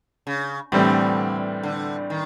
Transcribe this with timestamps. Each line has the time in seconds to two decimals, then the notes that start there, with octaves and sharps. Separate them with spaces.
0.27 C#3
0.72 A2 D3 E3 G3 C4
1.63 D3
2.10 D#3